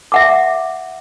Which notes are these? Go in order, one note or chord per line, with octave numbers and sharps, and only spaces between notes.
E5 F#5 D6